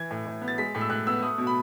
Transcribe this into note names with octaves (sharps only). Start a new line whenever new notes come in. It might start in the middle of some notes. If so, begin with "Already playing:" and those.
Already playing: E3 G#6
A2
A2
B3
A6
G#3 B6
A2
E6
A2 F#6
B3 E6
A3 D#6
B2
B5